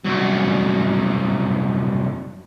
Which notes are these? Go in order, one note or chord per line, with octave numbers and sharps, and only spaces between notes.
C2 F#2